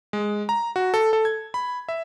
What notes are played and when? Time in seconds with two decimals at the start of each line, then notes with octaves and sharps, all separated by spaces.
0.13 G#3
0.49 A#5
0.76 F#4
0.94 A4
1.13 A4
1.25 G#6
1.54 B5
1.89 E5